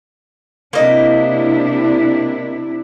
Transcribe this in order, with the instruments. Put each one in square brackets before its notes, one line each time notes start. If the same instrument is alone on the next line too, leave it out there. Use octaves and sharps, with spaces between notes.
[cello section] C3 D4 E4 [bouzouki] A#3 D#5